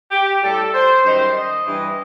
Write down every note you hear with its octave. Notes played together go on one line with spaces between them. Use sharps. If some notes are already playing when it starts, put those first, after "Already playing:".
G4
A2 G3 A4
C5
F#2 D#3 G3 C5
D#5
G2 E3 G3